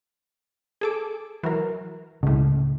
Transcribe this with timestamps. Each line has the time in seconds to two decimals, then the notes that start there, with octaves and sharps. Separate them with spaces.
0.81 G#4 A4 D6
1.43 E3 F#3 A#4
2.23 C#2 A2 C#3